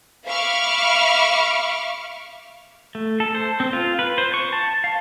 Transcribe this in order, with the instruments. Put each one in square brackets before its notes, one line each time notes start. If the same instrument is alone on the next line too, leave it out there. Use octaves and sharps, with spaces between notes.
[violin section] E5 F5 B5 C#6 D6 F6
[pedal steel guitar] A3
A4
C5
C4
F4
B4
C5
C#6
A5
F5